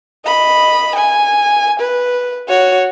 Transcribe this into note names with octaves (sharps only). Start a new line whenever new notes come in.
D#5 B5
G#5
B4
F#4 C#5